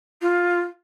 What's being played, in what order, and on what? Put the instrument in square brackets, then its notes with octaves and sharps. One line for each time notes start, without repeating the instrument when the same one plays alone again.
[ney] F4